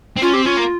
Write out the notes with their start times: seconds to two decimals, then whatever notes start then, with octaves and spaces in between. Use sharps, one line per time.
0.17 C4
0.22 C#4 F4
0.33 C4 G4
0.45 C#4 F4
0.57 A#3